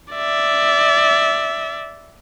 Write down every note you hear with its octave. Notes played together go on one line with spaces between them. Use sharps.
D5 E5